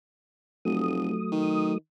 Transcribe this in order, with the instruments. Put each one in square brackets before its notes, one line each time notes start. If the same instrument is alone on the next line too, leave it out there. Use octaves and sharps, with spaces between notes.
[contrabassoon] F1 [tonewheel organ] F#3 A3 D#6
[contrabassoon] D#3